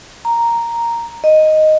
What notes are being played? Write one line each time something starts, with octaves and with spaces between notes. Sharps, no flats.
A#5
D#5